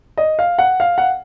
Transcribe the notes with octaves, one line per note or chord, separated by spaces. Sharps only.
D#5
F5
F#5
F5
F#5